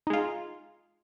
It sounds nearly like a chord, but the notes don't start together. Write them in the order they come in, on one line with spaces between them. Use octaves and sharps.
D#4 G#3 F4